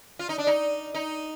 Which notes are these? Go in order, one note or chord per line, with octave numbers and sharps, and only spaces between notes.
F4
D#4
D4
D#4
D#4